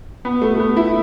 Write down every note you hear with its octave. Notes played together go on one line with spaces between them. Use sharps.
B3
A3
A3
B3
E4